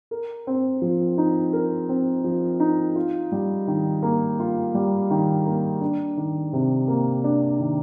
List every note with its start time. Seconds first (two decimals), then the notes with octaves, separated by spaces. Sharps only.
0.11 A#4
0.47 C4
0.82 F3
1.18 D#4
1.53 A#4
1.89 C4
2.24 F3
2.60 D#4
2.96 F4
3.32 G3
3.68 D#3
4.03 A#3
4.39 F4
4.75 G3
5.11 D#3
5.46 A#3
5.81 D4
6.17 D#3
6.53 C3
6.88 A#3
7.24 D4
7.60 D#3